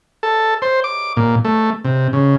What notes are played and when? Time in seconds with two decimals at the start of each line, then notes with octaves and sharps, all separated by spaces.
0.23 A4
0.62 C5
0.84 D6
1.17 A#2
1.45 A3
1.84 C3
2.13 C#3